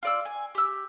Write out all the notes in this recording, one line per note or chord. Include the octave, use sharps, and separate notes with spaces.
F4 D5 E6
G#5
G4 E6